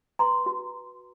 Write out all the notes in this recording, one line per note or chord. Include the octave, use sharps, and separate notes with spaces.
B4 A#5 C6
F#4